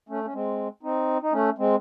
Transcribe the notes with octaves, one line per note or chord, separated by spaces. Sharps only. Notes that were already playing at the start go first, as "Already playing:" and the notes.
A3 C#4
C#4
G#3 C4
C4 D#4
D#4
A3 C#4
G#3 C4